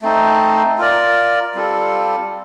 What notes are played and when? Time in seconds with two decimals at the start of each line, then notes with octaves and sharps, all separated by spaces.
0.02 A3 C4 D#4
0.78 F4 A#4 D5
1.55 G3 C4 F4 A4